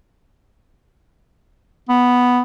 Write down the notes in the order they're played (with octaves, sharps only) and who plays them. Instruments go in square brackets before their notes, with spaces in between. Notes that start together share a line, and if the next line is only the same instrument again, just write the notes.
[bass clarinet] B3